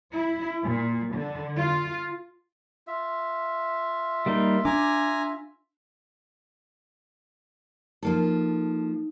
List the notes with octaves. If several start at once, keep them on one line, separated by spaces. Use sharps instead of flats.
E4
A#2
D3
F4
F4 E5
G3 A#3 D#4
D4 G#5 A#5 D6
F3 A#3 D#4 A4